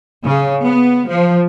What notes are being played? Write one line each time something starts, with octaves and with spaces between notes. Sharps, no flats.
C#3
B3
F3